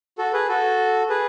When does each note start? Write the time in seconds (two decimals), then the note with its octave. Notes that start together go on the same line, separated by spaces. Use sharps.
0.18 F#4 A4
0.33 G#4 B4
0.48 F#4 A4
1.09 G#4 B4